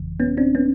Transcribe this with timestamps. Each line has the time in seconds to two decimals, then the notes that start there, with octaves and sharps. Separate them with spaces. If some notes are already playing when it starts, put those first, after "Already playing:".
Already playing: G1 F2 C#3 E3
0.20 B3 C#4
0.37 C4 D4
0.55 B3 C#4